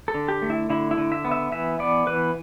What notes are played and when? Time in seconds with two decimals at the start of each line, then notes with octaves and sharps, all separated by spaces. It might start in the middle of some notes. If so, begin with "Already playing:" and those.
0.08 A4
0.14 D3
0.28 G4
0.42 A3
0.50 E4
0.70 D3 E4
0.91 E4
0.98 D3
1.12 E5
1.24 B3
1.32 E5
1.52 E3 E5
1.79 B3 D5
2.07 E3 B4